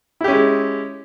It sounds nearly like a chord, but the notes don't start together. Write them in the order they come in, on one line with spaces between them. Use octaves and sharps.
E4 G4 C#4 G#3